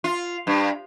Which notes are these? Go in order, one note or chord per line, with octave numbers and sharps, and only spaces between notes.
F4
G2